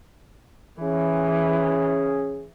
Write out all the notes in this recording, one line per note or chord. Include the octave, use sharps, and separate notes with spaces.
E3 C#4 G#4